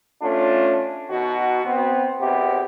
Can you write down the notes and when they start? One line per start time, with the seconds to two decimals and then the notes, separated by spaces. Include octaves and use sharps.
0.23 A3 C#4 D4 F4
1.11 B2 D#3 F#4
1.65 B3 C4
2.20 G#1 C3 B3 G4